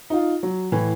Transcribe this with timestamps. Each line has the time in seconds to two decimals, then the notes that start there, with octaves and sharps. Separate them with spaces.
0.10 D#4 F4
0.43 F#3
0.72 A2 E3